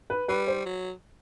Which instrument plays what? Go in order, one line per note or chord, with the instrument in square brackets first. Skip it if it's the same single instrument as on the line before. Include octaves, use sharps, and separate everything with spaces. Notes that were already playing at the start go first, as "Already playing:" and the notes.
[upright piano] B4
[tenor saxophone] G3 [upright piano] B4
[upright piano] C5
[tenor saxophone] F#3